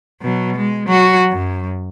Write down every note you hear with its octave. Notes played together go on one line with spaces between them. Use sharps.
B2 F#3
G#3
F#3 F#4
F#2